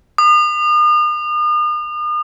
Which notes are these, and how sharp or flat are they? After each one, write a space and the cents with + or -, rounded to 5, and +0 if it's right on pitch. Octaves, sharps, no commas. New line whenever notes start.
D#6 -40